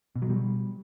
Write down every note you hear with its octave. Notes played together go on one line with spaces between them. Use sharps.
B2
F#3
G3